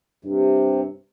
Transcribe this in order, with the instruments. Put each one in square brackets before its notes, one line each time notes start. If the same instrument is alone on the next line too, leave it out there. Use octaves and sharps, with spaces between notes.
[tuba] G2 [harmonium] C3